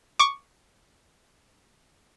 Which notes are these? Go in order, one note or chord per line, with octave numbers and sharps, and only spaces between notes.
C#6 D6